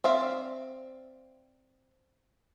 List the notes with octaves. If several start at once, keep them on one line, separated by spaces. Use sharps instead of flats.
C4 D5 E5 F5